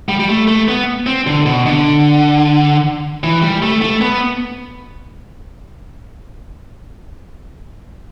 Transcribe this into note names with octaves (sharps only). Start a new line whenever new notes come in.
G3
G3
A3
A3
B3
C4
D3
B2
D3
E3
G3
A3
A3
B3